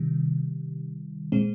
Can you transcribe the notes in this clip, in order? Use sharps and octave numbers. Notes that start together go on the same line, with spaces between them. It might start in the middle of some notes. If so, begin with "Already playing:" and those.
Already playing: C3 D#3 G3
A#2 G#3 C4